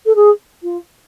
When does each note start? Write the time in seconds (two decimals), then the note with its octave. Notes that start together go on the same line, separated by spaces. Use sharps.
0.06 A4
0.15 G#4
0.62 F4